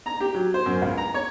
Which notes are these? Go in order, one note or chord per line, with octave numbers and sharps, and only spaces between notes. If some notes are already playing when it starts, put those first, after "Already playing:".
A#5
G4
F#3
C5
F#2
C#2
A#5
C#5